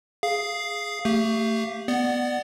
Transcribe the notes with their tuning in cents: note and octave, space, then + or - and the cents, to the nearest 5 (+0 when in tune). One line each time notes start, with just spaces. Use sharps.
G#4 +0 F5 +0
A3 +30 G4 +0 F5 +0
B3 +0 D5 +20 F#5 +20